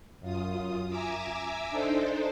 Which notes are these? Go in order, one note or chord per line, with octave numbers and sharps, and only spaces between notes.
F#2 F4 D#6
E5 G#5 A#5 D6 E6
D4 D#4 A4 C5